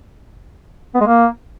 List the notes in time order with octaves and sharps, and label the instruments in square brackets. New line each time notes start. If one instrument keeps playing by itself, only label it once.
[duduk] B3
G#3
A#3